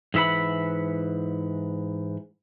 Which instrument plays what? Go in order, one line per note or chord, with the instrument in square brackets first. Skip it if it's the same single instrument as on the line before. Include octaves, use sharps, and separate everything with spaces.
[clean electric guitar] G#2 E3 E5 F#5 B5